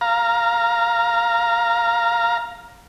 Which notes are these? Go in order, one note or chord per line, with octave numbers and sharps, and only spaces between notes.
F5 A#5